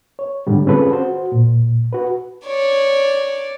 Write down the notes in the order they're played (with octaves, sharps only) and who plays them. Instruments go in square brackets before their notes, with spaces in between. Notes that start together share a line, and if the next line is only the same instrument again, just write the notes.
[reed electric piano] C#5
G#2 D3 G3
C4 C#4 F4 G#4 A4 B4
F#4 C5
A#2
F#4 B4
[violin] C#5 D5